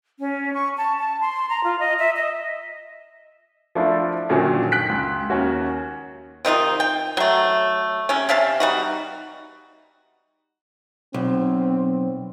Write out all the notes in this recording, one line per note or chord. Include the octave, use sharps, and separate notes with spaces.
C#4
C#6
A5
A5
C6
A#5
F4
D#5
E5
D#5
F3 A3 D4 E4 F4
F#2 A#2 D3 D#3 F3 F#3
G5 F#6 B6 D7
C#2
D#2 C#4 F#4
C3 D#3 D#4 F4
G5
F#3 A3
C3 C#4
C3 E5 F5 A5
G3 D#4 F#4
B1 C4